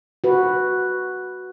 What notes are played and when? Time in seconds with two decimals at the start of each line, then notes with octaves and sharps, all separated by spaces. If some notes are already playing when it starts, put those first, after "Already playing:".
0.24 F#4 B4